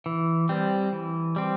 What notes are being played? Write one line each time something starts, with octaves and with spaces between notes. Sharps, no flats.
E3
G3 C4
E3
G3 C4